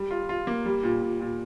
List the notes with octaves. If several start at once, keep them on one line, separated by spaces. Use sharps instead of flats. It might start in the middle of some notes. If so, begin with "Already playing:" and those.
Already playing: G3
F4
F4
A#3
G3
A#2
A#2
A#2